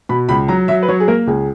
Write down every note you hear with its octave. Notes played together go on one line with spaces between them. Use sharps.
B2 B5
C#2 B5
F#3 A#5
F#3 E5
B4
F#3 C#5
G#4
A#3 A#4
C#2 G#4